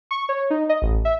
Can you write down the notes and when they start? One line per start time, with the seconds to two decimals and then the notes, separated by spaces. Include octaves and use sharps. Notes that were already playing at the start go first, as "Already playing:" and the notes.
0.11 C#6
0.29 C#5
0.50 D#4
0.69 D#5
0.82 A1
1.05 E5